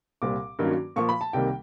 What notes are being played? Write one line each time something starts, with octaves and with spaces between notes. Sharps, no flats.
C2 A#2 G3 C4 D6
G2 D#3 F#3 A#3 C#4
A#2 F3 A#3 C#6
B5
A5
C2 C3 D#3 G3 A#3 G5